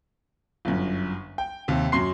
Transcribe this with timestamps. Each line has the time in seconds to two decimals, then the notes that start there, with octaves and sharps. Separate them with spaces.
0.65 G1 F#2
1.38 G5
1.68 D#2 C3
1.92 F#2 F#3 C6 C7